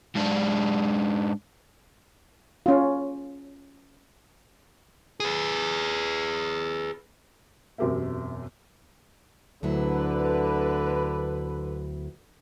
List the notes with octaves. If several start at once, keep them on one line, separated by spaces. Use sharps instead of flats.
G#2 D4
C#4 F4
G#4 B4
E1 F#2 C4 G4 A#4 E5
D2 D3 F#3 E4 B4